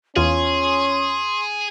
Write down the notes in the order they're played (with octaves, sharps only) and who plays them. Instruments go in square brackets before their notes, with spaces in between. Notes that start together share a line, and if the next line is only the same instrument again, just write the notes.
[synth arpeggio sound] E2 F4 [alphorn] C#4 [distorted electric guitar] G#4 [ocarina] C6